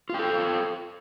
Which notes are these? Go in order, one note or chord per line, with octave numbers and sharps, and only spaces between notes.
F4 A4 G5